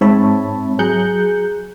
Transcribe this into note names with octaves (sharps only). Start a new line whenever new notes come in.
G#2 C4 C#5 E5 A5 B5
F#3 G#4 A#5 F#6 G6 C#7